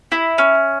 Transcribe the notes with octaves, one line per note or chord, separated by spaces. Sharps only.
E4
C#4